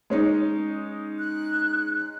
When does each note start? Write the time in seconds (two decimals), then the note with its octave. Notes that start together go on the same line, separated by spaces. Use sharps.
0.10 G#3 C#4 D#4
1.19 F#6